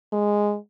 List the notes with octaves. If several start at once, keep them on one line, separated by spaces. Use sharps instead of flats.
G#3